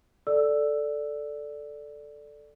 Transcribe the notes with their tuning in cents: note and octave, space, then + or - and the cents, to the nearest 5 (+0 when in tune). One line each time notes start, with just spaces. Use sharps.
A4 +0 D5 +0 E6 +5